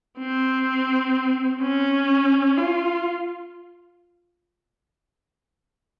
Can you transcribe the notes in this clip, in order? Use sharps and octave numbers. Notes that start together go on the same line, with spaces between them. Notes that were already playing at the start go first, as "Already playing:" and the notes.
C4
C#4
F4